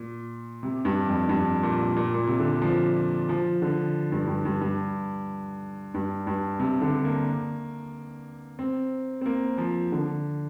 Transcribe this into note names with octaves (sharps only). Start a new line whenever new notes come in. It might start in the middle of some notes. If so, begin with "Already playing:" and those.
Already playing: A#2
C3
G2
F2
G2
A#2
A#2
A#2
C3
D3
F3
F3
D3
G2
G2
G2
G2
G2
G2
C3
D3
A#3
C4
C4
A#3
F3
D3